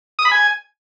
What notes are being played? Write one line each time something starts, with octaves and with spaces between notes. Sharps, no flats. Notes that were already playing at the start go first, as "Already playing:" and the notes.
D#6
B5
G#5